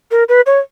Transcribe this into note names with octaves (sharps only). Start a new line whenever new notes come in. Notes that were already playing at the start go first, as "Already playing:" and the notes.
A#4
B4
C#5